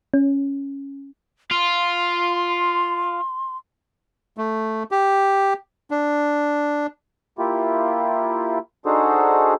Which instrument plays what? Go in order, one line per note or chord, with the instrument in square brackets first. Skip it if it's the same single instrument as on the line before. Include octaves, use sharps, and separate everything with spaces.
[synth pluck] C#4
[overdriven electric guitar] F4 [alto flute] C6
[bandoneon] A3
G4
D4
[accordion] A#3 E4 F4 G4
D4 D#4 F#4 G#4 A4 C5